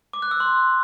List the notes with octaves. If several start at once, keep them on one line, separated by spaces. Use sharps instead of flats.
D6
F#6
E6
C6